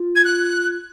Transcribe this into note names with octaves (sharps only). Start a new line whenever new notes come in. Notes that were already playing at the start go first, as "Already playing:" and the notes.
Already playing: F4
G#6
F#6